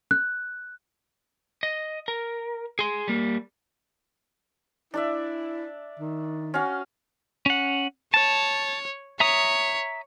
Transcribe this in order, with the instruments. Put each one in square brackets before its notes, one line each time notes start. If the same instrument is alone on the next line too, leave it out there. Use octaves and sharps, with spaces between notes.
[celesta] F#6
[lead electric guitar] D#5
A#4
G#4 C6
G3 A#3
[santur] D4 D5 E5 [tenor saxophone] E4
[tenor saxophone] D#3
[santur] C#4 F#4 F5
[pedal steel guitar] C#4 F#5
[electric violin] C#5 [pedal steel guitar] A5
[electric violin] C#5 [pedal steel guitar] E5 A#5 D#6